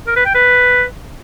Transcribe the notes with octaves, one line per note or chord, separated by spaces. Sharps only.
A#4
B4
G5
B4